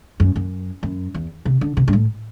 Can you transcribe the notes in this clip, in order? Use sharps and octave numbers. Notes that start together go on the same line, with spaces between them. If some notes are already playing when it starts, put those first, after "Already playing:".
F#2
F#2
F#2
E2
C3
D3
C3
G2
A2